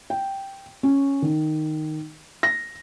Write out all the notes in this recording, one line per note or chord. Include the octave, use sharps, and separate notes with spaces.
G5
C#4
D#3
A#6